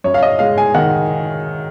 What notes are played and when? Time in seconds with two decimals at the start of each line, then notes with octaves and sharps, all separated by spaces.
0.04 F#2 C#5
0.14 F5
0.23 D#5
0.39 G#3 F5
0.58 G#5
0.74 D#3 F#5